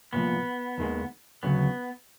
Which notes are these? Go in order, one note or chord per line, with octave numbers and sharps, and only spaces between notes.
C2 A#2 F3 B3
D#2 D#3 G#3
D2 C#3 F#3 B3